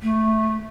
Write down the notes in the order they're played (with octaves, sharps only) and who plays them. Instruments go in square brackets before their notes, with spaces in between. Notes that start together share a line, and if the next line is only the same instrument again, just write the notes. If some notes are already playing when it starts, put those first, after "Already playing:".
[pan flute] A3